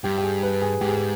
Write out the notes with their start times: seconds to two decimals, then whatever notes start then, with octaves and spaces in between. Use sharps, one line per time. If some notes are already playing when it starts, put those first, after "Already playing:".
0.04 G2 G4
0.18 G4
0.23 G#4
0.43 B4
0.62 G#4
0.81 G#2 G4
0.89 G#4
0.97 G4